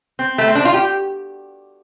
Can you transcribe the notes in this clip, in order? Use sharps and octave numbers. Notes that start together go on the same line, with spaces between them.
C4
A3
C4
D4
F4
G4